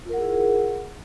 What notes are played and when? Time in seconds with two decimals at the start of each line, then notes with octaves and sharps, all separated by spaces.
0.05 F4
0.09 A#4
0.13 F#5
0.17 G#4
0.21 E4